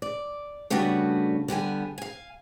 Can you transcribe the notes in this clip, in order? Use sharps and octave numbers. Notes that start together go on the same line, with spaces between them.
D5
C#3 G3 A3 B3 D4 F#4
D3 G3 B3 G#5
F5 G#5